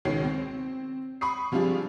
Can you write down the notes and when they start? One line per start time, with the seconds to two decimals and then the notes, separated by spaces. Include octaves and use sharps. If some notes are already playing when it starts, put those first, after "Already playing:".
0.05 C#2 B2 D#3 C#5 C7
0.25 C4
1.21 B5 C#6 D#6 C7
1.52 C3 F3 G3 D4 F4 G#4